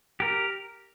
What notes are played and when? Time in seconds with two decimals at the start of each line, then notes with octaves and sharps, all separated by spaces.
0.20 G4 A#4